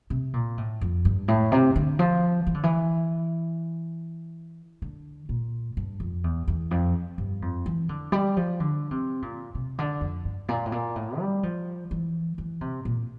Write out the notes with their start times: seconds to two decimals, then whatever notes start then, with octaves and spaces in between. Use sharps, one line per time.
0.10 C3
0.33 A#2
0.58 A2
0.81 F2
1.05 G2
1.28 A2
1.52 C3
1.76 D3
1.99 F3
2.47 E3
2.54 D3
2.63 E3
4.82 D3
5.29 A#2
5.77 G2
6.00 F2
6.24 E2
6.48 E2
6.71 F2
7.18 G2
7.42 F2
7.66 E3
7.89 D3
8.12 G3
8.37 F3
8.60 D3
8.91 C3
9.22 A#2
9.55 C3
9.79 D3
10.01 F2
10.25 G2
10.49 A#2
10.66 A2
10.72 A#2
10.96 A2
11.19 G3
11.43 F3
11.91 E3
12.38 E3
12.61 C3
12.85 A#2